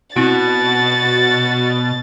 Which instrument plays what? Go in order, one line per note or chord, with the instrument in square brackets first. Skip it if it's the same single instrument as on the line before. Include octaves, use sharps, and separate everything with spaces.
[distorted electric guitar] B2 [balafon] C4 E4 [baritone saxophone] F#4 [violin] A6